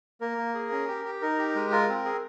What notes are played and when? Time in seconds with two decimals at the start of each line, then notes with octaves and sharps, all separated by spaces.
0.21 A#3 A#4
0.38 A#3
0.54 G#4
0.72 C#4
0.88 G4
1.05 G4
1.21 D#4 A#4
1.39 G4
1.55 G#3
1.71 F4 A#4
1.89 C4
2.05 G#4